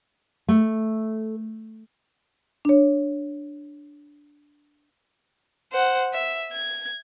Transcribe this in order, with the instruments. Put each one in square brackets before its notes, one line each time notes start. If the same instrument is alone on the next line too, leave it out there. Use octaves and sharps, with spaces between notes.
[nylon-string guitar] A3
[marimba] D4 C#5
[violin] C5 F#5
E5
G#6